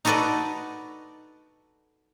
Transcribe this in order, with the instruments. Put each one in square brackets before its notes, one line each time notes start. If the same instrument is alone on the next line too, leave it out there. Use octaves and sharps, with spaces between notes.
[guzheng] D#4 F#4 A4 B4 D5 D#5